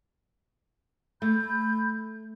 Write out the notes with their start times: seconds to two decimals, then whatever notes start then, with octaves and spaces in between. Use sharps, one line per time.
1.22 A3 B5 G6